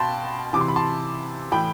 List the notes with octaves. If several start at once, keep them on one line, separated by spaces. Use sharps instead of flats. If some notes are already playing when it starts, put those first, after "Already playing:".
Already playing: B2 F5 G5 A5 B5 C6
C3 E3 D6
C6
B5
A5 C6
A2 E3 G5 B5